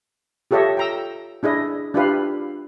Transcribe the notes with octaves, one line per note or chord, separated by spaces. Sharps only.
F4 G4 A4 C#5 D#5 E5
G5 A#5 E6
D4 E4 G#4 D#5
D4 E4 F4 G4 B4 F5